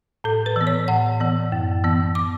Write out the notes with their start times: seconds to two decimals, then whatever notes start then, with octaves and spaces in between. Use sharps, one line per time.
0.24 A2 A4
0.46 B4
0.56 E3 B3
0.67 C#5
0.88 A2 F#5
1.20 E3 B3
1.52 F#2
1.84 E3 B3
2.15 D6